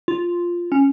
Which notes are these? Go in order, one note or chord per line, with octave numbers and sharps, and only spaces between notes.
F4
C#4